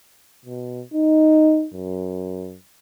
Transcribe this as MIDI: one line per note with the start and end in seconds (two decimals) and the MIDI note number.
0.46 0.82 47
0.94 1.67 63
1.74 2.57 42